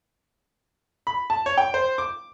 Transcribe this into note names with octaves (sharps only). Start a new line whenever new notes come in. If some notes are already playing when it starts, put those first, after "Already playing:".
B5
A5
C#5
G5
C5
D6